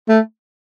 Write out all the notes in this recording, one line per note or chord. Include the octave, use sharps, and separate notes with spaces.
A3